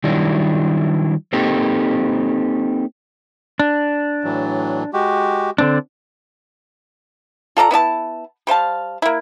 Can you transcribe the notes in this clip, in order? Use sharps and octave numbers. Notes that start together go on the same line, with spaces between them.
D#3 F#3 G3 D4 E4
A#3 C4 D#4 G4 A4
D4
A2 E3 F#3
G#3 F#4 G4
D3 C4 D4
F4 A4 D5 A#5
B3 E4 D5 A5
G3 C5 F5 A5
A#3 E4